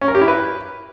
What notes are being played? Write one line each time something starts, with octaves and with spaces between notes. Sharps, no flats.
C#4
A#4
G4
E4
B4